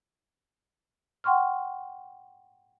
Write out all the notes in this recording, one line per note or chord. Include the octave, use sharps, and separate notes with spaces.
F#5 G5 C6 C#6 F6